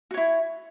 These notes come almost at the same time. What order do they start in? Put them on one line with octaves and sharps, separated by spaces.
F#4 C#5 E4